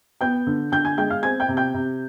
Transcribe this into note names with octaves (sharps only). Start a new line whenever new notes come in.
B3 G5 G6
D3
D3 G5 G6
G#5 G#6
G#3 G5 G6
F5 F6
C4 G#5 G#6
G5 G6
C3
G5 G6
C3